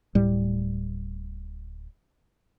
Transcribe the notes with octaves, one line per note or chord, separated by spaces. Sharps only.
D1 A2 G3